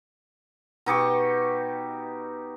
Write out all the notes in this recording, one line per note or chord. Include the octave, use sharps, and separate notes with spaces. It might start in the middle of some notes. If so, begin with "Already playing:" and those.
B2 D#4 G4 C#6